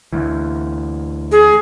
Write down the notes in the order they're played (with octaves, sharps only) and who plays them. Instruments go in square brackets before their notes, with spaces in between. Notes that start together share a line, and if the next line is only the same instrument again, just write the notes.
[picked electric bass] D2 E3
[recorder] G#4